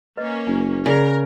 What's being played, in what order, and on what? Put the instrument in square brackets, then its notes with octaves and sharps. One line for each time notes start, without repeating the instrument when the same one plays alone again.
[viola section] A#3 C#4 [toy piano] B4 D#5
[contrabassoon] F#1 [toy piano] G#5
[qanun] C#3 [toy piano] G#4 D5 G#5 [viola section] A#4